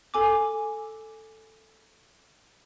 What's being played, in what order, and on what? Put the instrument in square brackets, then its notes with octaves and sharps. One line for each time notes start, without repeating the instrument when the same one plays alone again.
[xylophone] A4 G#5 D6